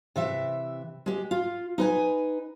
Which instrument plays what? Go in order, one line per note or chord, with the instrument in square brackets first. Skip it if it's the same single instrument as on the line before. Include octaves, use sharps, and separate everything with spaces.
[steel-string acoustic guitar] C3 E3 E5
G#3 G4
F4
D#4 B4 G#5